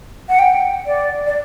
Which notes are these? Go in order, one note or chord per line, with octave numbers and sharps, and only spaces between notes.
F#5
G5
D5
D5